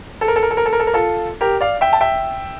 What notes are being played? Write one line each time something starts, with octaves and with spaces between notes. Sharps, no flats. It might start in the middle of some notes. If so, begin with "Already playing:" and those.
A4
A#4
A4
A#4
A4
A#4
A4
A#4
A4
A#4
F4 A4
G4 A#4
D5 F5
E5 G5
A5
E5 G5